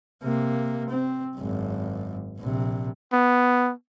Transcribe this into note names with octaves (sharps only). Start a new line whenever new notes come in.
C3 A#3
C4
G#1 F#2
A#1 C3
B3